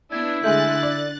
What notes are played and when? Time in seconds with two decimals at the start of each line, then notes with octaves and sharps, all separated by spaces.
0.12 B3 D4 E4 G#6
0.44 D3 G#3 A3 D4 E5 F#6 G6 A6
0.83 D5